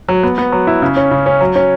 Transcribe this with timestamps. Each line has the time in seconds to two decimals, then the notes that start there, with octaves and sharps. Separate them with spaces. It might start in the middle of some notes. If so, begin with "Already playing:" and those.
0.08 F#3
0.23 B3
0.38 B3
0.52 F#3
0.67 E4
0.82 C#3
0.96 C#4
1.11 C#3
1.26 C#4
1.41 F#3
1.55 C#4